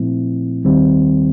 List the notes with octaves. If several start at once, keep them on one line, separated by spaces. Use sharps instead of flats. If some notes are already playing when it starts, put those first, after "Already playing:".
Already playing: A#2 F3 A3 C4 E4
D#2 D#3 G3 C4